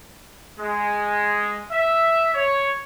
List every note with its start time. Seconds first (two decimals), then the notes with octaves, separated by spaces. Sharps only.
0.58 G#3
1.72 E5
2.35 C#5